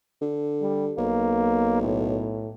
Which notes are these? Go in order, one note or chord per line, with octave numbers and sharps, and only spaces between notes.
D3
G3
B1 A#3
A2